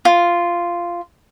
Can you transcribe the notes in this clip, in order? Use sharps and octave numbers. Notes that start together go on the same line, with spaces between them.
F4